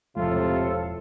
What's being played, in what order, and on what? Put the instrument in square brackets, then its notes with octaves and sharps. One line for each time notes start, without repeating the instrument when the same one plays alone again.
[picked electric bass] E1 F3 G#3 [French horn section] A2 C3 [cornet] F4 [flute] A4